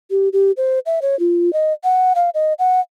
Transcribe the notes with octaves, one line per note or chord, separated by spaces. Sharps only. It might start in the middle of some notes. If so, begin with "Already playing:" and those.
G4
G4
C5
E5
C#5
F4
D#5
F#5
F5
D#5
F#5